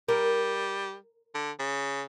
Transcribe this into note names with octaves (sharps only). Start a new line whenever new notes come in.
G3 A#4
D3
C#3